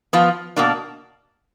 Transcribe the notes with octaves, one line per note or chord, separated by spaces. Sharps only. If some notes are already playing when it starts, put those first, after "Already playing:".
F3 B3 F4
B2 A#3 D4